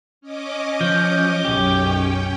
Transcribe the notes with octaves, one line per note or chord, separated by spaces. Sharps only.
C#4 D#5 D6
F3 G6
B1 F#2 C#4 G4 G5